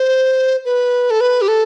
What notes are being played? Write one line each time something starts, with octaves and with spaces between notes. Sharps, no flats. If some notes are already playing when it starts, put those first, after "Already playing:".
Already playing: C5
B4
A4
B4
G4
A4